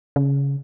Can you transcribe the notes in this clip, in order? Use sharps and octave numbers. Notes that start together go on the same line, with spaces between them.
C#3